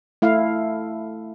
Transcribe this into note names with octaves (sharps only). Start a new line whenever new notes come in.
A3 E4 F5